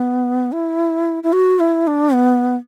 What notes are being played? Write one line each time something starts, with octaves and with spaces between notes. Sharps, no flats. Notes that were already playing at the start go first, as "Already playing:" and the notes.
Already playing: B3
E4
E4
F#4
E4
D4
B3